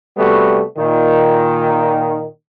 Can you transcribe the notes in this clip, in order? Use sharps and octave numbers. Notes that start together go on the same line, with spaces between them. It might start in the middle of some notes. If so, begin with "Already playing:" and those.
C3 G3 A3 B3 F#4
A#2 D#3